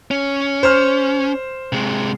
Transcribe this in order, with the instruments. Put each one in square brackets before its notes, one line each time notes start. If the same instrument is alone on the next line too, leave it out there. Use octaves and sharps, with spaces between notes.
[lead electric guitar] C#4
[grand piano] C5 F6
[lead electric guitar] C3 G#3